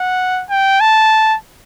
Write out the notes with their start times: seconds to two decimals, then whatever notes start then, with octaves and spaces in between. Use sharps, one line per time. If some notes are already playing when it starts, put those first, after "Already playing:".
Already playing: F#5
0.50 G5
0.80 A5